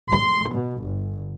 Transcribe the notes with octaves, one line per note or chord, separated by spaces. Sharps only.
C6
B2
G1